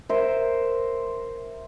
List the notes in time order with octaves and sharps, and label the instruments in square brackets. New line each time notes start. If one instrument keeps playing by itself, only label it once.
[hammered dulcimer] A#4 C5 D#5 E5